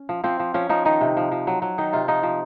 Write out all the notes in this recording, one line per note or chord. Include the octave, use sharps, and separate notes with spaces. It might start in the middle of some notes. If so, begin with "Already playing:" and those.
Already playing: C#4
F3
F3 C4
F3
F3 C#4
F3 D#4
D#3 D#4
C3
F3
F3
F#3
F#3
D#3 D#4
C3 F4
F3 D#4
F3